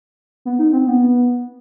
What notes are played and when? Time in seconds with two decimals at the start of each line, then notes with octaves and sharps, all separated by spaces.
0.45 B3
0.59 D#4
0.73 C4
0.87 B3